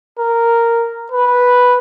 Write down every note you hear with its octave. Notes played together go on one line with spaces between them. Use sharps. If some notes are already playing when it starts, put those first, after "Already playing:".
A#4
B4